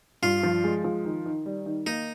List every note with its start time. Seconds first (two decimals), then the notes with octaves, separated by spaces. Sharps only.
0.22 G2 F4
0.43 F3
0.64 G#3
0.84 F3
1.05 D#3
1.26 D#3
1.46 G3
1.66 D#3
1.86 A#3 D#4